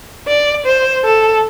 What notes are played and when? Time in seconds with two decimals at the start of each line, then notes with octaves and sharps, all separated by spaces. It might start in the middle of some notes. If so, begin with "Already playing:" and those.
0.28 D5
0.66 C5
1.05 A4